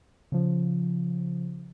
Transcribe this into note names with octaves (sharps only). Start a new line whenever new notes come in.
C#3 F3